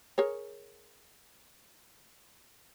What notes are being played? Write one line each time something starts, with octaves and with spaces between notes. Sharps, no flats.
G#4 A#4 C#5